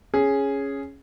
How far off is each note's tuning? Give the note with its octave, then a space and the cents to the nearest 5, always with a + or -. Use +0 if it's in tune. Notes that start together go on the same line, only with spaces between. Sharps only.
C#4 +0 G#4 +0